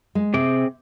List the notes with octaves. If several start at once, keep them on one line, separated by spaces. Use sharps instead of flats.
G#3
C3 C4 G#4 D6